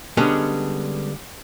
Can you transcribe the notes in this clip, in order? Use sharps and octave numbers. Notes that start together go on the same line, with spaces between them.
D3 G3 G#3 B3 C#4 D4